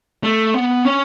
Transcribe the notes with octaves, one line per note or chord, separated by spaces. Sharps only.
A3
B3
C#4